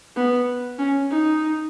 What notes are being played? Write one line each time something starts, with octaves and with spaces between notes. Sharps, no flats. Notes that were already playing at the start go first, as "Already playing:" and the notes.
B3
C#4
D#4